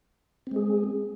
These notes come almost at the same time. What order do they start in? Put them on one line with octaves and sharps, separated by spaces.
C4 G#3 G#4